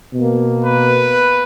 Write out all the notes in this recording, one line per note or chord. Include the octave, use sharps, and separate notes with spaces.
B2 A#3
B4